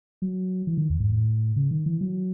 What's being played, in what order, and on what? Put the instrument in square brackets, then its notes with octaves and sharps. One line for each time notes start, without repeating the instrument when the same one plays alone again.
[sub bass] F#3
E3
D#3
E2
G#2
A2
C#3
D#3
E3
F#3